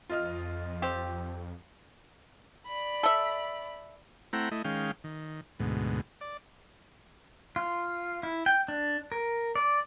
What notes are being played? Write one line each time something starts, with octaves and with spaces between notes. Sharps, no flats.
F2 F4 D#5 F6
C4 G4
D5 B5
A4 E5
A3 C4 E4 F#5 G5 A#5
A3 E4 D#5
D#3 G#3 C#4 F5 G5
D#3
D2 G#2 B2
D5
F4
E4
G5
D4
A#4
D5